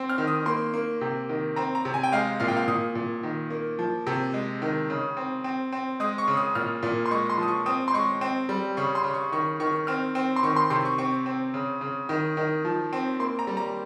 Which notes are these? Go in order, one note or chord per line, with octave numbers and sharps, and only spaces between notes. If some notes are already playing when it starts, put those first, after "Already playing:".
Already playing: C4
F6
D#3
D#6
A#3 C6
A#3
C3
D#3
C4 A#5
A#5
C3
G#5
G5
G#3 F5
A#2 F5
G5
F5
A#2 D#6
A#2
D#3
A#3
F3
C3
G#3
D#3
C#3
C4
C4
C4
G#3 D#6
C#6
C#3
D#6
A#2 F6
A#2
C6
G#3 C#6
C6
F3 D#6
C#6
C4 D#6
C6
G#3 C#6
C4
G3
C#3 C#6
C6
C#3
C#6
D#3 C#6
D#3 C#6
C4 F6
C4
C6
D#3 C#6
C6
C3 C6
C#6
C4 C#6
C4
C#3
C#3
D#3
D#3
F3
C4
A#3 C6
A#5
G3
A#5